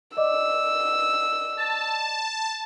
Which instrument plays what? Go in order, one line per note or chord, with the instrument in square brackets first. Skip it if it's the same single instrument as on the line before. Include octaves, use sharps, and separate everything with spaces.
[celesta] D5 D#5 D6 [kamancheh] E6
[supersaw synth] A5